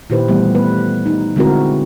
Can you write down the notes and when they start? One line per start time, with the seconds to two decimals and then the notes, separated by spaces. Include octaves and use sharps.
0.10 A#2 D#3 E4 G4 B4 C5
0.28 E3 G3 A3 B3
0.55 A3 B3 B4
1.06 D#4
1.36 D3 G#3 C4 E4 F#4 A#4